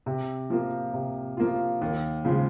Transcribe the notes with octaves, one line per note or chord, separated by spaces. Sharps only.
C3
F3 A#3 F4
C3
F3 A#3 F4
D#2
C#3 F3 G#3